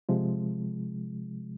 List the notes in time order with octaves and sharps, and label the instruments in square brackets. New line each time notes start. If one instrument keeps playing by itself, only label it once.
[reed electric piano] C3 F3 G#3